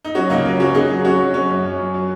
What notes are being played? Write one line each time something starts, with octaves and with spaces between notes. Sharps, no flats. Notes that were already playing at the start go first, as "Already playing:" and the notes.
D#4
F#3 C#4 F#4
C#2 A#3 D#4
F#3 C#4
F#3 C#4 F#4
C#3 D#4 G#4
F#3
F#3 C#4 F#4
F#3
F#3 C#4
F#2
F#2
F#3
F#3